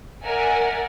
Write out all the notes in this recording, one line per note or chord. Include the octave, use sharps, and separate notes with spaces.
A#4 D5 E5 F#5 G#5